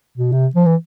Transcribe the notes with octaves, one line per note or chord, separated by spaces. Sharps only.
B2
C3
F3
E3